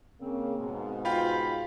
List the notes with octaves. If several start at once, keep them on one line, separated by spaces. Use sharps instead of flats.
C#3 A#3 C4
G#2 B2
F4 F5 G5 B5